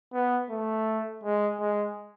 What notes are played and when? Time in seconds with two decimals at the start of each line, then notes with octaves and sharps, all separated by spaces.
0.13 B3
0.50 A3
1.23 G#3
1.60 G#3